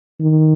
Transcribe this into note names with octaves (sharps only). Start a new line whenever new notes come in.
D#3